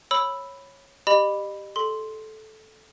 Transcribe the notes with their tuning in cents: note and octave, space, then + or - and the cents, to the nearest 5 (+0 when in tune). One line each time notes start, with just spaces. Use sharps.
C#5 -10 B5 +0 E6 +0
G4 +0 D#5 -35 B5 +0
A4 -15 C6 +0